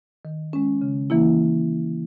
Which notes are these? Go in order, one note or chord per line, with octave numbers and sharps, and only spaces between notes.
D#3
G#3 C#4
C#3
E3 A#3 E4